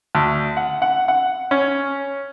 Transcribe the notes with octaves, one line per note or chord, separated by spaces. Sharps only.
D2
F#5
F#5
F#5
C#4